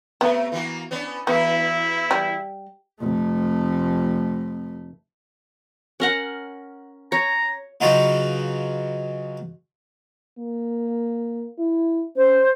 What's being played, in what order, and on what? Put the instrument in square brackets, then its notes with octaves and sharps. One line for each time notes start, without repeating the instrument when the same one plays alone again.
[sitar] C3 A3 [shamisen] B3
[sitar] E3 A#3 F#4
B3 C#4 D4
[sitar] E2 E3 F#4 [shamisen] B3 [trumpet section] E4
[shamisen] G3
[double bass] F1 A3
[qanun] C#4 A#4 F#5
[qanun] C#5 [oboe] A#5
[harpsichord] C#3 F#3 D#4 F4 F#4 B4
[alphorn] A#3
E4
[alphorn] C#4 [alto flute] C5